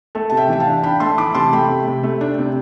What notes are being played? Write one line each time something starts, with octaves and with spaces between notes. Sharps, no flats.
A3 A4
C3 A5
E5 G5
E3 G5
F5 A5
D4
D4 G5 B5
A3 A5 C6
E3 B5 D6
C3 A5 C6
A3 G5 B5
C3
C3
A3
D4
C3